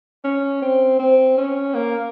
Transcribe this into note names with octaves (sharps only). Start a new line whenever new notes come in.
C#4
C4
C4
C#4
A#3